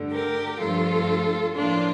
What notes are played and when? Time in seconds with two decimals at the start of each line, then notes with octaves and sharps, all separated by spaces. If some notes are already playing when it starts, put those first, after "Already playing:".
Already playing: G2 D3 A3
0.11 G4 A#4
0.59 G2 F3 A3 F4 A4
1.55 A2 F3 A#3 D4 F4